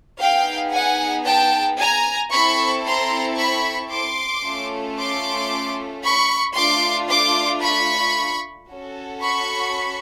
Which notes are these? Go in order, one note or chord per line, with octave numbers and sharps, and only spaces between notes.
B3 D#4 G#4 F5 G5
F#5 G#5
G5 A5
G#5 A#5
C4 E4 A4 B5 C#6
A#5 C6
B5 C#6
C6 D6
A3 C#4 F4 A4
C6 D6
B5 C#6
A3 D4 F4 C6 D6
C6 D6
B5 C#6
C#4 F#4 A4
B5 C#6